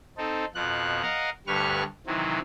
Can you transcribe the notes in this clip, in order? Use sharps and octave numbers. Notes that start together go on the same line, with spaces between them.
C4 D#4 A4
F2 B2 F3 F#6
A#4 D#5 F5 F#5
D2 G2 G3 B4 C#6 F6
C3 D#3 E3 F#3 C4